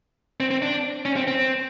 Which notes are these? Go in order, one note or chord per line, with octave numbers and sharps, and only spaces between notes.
C4
C4
D4
C#4
C4
C4